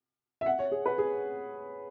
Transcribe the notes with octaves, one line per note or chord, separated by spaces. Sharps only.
E5
F#5
C#5
G#4
B4
G#4